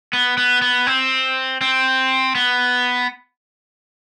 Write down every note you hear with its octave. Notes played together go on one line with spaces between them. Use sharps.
B3
B3
B3
C4
C4
B3